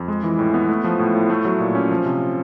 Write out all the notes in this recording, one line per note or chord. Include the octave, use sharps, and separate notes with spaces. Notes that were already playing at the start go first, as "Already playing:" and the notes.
Already playing: F2
G#3
E3
A2
B3
A3
F3
A2
A2
A3
F#3
A#2
C#4
F3
C3